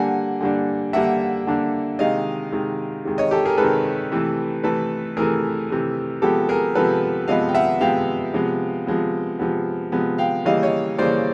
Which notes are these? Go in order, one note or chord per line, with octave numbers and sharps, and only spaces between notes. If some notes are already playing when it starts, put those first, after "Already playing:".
Already playing: D3 G3 A#3 D4 F#5 G#5
D3 G3 A#3 D4
D3 G3 A#3 D4 E5 F#5
D3 G3 A#3 D4
C3 D#3 G#3 D#5 F5
C3 D#3 G#3
C3 D#3 G#3
C#5 D#5
G4 A4
G#4 A#4
C3 D#3 G#3 A4 B4
C3 E3 A3
C3 E3 A3 A4 B4
C3 E3 A3 G#4 A#4
C3 E3 A3
C3 F3 G#3 B3 G4 A4
G#4 A#4
C3 F3 G#3 B3 A4 B4
C3 F3 G#3 B3 D#5 F5
G5
E5 F#5
C3 F3 G#3 B3 F5 G5
C3 F3 G#3 B3
C3 F3 G#3 B3
C3 F3 G#3 B3
C3 F3 G#3 B3
F5 G5
C#3 E3 G3 A#3 D#5 F5
C#5 D#5
C#3 E3 G3 A#3 C5 D5